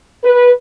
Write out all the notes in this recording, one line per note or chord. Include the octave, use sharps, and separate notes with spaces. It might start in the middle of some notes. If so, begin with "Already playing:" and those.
B4